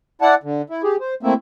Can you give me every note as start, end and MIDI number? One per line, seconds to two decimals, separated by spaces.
0.22 0.35 64
0.22 0.35 74
0.22 0.35 78
0.22 0.35 81
0.43 0.62 50
0.70 0.82 64
0.84 0.96 67
0.84 0.96 68
1.01 1.14 72
1.23 1.34 57
1.23 1.34 58
1.23 1.34 60
1.23 1.34 64
1.23 1.34 76